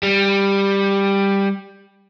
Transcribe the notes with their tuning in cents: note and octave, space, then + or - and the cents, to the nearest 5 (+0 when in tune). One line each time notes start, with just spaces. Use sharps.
G3 +10